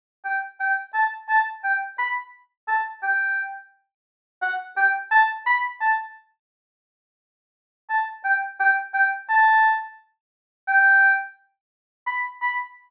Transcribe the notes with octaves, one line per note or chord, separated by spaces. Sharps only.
G5
G5
A5
A5
G5
B5
A5
G5
F#5
G5
A5
B5
A5
A5
G5
G5
G5
A5
G5
B5
B5